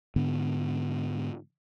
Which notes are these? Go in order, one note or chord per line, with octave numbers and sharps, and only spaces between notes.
G#2 D3 B3